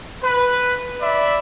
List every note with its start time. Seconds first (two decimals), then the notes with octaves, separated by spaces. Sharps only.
0.23 B4
1.01 D5 E5 B5